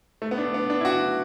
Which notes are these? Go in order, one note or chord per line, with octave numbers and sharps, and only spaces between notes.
A3
B3
D4
B3
D4
E4
F#4